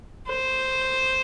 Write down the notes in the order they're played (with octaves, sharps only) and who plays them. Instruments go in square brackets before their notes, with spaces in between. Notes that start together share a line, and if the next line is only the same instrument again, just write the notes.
[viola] C5